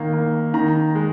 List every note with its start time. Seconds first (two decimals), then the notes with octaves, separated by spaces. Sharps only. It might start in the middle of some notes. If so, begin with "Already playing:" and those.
Already playing: D#3 A#3
0.13 A#3
0.54 D#3 A#5
0.95 G#3